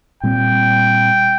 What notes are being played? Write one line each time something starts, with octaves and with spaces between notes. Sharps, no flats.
A#2 G3 C4 G5